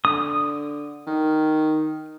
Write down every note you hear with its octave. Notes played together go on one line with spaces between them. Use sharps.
D3 D#6
D#3